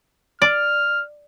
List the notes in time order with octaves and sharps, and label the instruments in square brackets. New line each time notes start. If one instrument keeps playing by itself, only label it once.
[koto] D5 [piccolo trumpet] F6